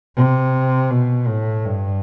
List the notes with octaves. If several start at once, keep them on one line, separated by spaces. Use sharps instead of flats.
C3
B2
A2
G2